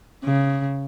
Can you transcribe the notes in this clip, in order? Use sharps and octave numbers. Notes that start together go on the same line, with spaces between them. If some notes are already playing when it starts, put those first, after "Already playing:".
C#3